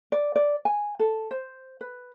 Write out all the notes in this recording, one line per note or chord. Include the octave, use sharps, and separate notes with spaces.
D5
D5
G#5
A4
C5
B4